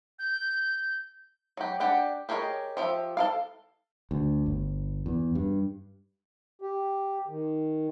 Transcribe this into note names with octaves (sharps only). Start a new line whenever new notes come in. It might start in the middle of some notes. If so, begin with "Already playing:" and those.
G6
F#3 G4
D4 G4 F#5
G4 G#4 A#4 C#5 D#5
F3 G4 E5
A4 A#4 F5
D2
G1
E2
G2
G4
D#3